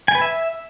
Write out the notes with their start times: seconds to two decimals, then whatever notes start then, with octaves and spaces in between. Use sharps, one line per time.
0.08 G#5
0.15 B4
0.21 E5